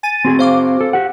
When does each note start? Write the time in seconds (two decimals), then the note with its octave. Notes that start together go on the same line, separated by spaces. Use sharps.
0.03 G#5 A6 D#7
0.25 C4 F#4 G#4
0.39 C5 F5 D6
0.81 A4
0.93 G4 F#5